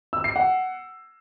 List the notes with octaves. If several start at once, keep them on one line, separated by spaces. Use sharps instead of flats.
E6
C7
F#5